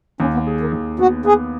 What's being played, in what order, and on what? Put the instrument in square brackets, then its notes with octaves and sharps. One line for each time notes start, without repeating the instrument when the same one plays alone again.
[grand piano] D#2 [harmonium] C#4
[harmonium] B3
[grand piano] G#4
[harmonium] D#3
[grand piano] D#2
[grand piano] B3 [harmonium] F#4
[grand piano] B3 [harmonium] G#4